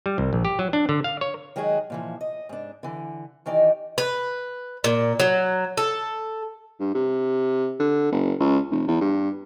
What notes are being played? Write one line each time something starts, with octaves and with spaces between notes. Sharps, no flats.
G3
C2
A#1
G4
F#3
D4
D3
F5
C#5
D#3 F#3 G#3 F#4 G#4
A#2 E3 F3
D#5
G#2 D4
D3 E3
D#3 E3 D#4 G4 D5
B4
A#2
F#3
A4
G2
C3
D3
F#1
C#2
F1
E2
G2